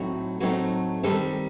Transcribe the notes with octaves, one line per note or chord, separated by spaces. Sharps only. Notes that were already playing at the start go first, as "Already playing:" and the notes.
Already playing: A2 F#3 A3 C4 D#4
A2 F#3 A3 C4 D#4
D#3 G3 C4 D#4 A4